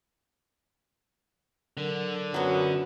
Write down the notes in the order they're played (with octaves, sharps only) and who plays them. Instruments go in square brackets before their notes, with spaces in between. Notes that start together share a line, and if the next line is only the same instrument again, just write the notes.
[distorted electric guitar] D3 [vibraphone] F#3 A#4
[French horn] F#2 [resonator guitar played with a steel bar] F#3 B3 [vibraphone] F4 F#4